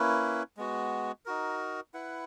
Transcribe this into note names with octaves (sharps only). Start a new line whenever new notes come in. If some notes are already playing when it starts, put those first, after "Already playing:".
Already playing: A#3 C#4 E4 B4
G#3 B3 F#4
D#4 F#4 A#4
E4 B4 F#5